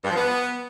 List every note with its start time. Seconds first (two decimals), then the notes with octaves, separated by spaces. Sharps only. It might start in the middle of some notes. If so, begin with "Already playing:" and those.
0.05 G2
0.10 F3
0.16 B3